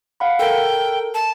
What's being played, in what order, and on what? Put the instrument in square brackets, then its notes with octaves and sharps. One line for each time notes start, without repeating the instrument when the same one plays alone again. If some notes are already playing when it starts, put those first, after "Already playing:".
[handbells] F5 F#5 B5
[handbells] A4 A#4 [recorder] G5
[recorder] A5